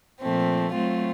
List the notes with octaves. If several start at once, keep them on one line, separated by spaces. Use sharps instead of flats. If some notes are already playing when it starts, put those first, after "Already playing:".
A#2 F3 A3 C4
F#3 A3 C4 F4